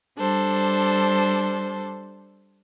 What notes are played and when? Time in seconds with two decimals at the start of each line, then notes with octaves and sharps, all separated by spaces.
0.18 G3 D4 A4 C5